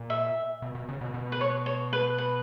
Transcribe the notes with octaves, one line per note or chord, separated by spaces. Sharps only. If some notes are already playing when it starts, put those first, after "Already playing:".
Already playing: A#2
E5
B2
B2
C#3
B2
B2
B4
C#5
C#5
B4
B4